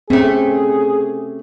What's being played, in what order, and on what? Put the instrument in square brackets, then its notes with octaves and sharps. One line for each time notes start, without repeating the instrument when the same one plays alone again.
[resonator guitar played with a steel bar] C3 A3 [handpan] C4 C#4 [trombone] G#4